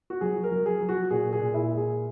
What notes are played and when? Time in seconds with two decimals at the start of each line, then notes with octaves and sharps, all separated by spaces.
0.10 F#4
0.21 F#3 G#4
0.44 A#4
0.52 F#3
0.66 G#4
0.81 F#3
0.89 F#4
1.11 A#2 G#4
1.33 G#4
1.40 A#2
1.54 E4
1.69 G#3
1.77 G#4